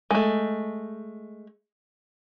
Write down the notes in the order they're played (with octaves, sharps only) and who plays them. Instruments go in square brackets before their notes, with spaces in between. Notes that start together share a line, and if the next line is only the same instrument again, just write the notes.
[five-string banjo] G#3 A3